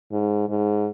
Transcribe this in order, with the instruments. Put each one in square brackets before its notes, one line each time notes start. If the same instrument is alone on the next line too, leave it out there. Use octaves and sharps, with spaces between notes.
[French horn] G#2
G#2